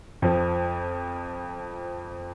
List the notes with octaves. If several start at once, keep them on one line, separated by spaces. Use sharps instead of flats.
F2 F3